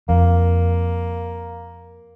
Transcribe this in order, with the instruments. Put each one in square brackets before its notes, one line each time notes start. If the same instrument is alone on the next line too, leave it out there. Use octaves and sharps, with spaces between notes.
[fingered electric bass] F2 [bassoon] A#3